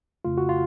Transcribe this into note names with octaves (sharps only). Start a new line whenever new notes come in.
F2 C#3 A3 F4
F#4
F4